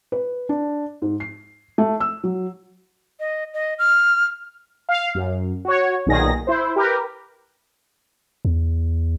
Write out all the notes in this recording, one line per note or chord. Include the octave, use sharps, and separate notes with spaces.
B4
D4
G#2
C7
A3
E6
F#3
D#5
D#5
F6
F5
F#2
F#4 C#5
B1 A#2 D#3 G#4 A#6
E4 C5
G4 A#4 B4
E2